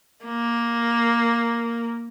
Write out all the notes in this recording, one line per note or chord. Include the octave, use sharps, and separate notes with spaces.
A#3